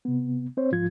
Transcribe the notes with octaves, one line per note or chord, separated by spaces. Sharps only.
C3 B3
C4 C5 C#5
G#2 F3 F4 G#6